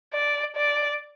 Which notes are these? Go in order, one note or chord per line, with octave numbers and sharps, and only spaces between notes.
D5
D5